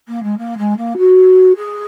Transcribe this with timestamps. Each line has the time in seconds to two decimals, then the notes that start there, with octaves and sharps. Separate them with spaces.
0.08 A#3
0.23 G#3
0.38 A#3
0.58 G#3
0.77 A#3
0.97 F#4
1.56 G#4